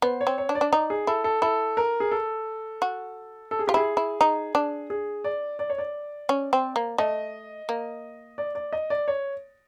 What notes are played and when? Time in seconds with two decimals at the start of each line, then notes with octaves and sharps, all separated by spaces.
0.02 B3 C5
0.21 C#5
0.27 C4
0.38 C#5
0.49 D4
0.55 D5
0.61 D4
0.72 D#4 D5
0.90 G#4
1.07 E4 A4
1.24 A4
1.42 E4 A4
1.77 A#4
2.00 G#4
2.11 A4
2.82 F#4
3.51 A4
3.59 G#4
3.67 F4 G4
3.74 E4 G#4
3.97 E4
4.21 D#4
4.55 D4
4.90 G#4
5.24 D5
5.59 D5
5.70 C#5
5.78 D5
6.29 C#4
6.53 C4
6.76 A#3
6.98 A3 D#5
7.69 A#3
8.38 D5
8.55 D5
8.73 D#5
8.90 D5
9.08 C#5